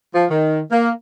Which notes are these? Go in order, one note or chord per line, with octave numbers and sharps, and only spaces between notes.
F3
D#3
A#3